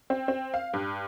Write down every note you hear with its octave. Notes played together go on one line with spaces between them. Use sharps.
C4
C4
F5
G2